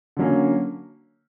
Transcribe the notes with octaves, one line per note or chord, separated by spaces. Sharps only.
D3 F#3 A#3 C#4